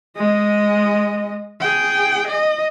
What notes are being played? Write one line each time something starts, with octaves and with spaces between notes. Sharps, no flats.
G#3 D#5
G#4 G5
D#5